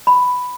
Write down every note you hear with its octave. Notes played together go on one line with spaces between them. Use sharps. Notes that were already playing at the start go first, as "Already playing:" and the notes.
B5